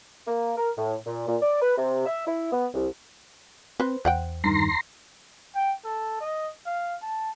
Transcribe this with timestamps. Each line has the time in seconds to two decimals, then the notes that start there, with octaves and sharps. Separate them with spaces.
0.27 A#3
0.57 A#4
0.77 A2
1.06 A#2
1.27 A#2
1.41 D5
1.62 B4
1.77 C3
2.06 E5
2.27 E4
2.52 B3
2.74 C2
3.80 C4 B4 C5
4.05 E2 C5 F#5 G5
4.44 G2 D#3 A#5 C6
5.55 G5
5.85 A4
6.21 D#5
6.66 F5
7.02 A5